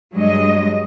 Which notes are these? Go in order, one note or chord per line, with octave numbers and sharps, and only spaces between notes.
G2 F#3 G#3 D#5